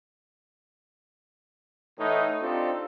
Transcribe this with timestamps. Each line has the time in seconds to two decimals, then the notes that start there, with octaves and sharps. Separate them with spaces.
1.99 A2 E3 A3 D#4
2.42 C4 D4 D#4 F4 G4 A4